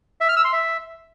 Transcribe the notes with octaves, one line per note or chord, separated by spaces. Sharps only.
E5
F6
E6
C6
E5